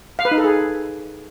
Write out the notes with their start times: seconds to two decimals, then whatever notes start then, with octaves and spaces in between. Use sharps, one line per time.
0.19 F5
0.25 B4
0.31 D#4
0.38 A4
0.44 G#4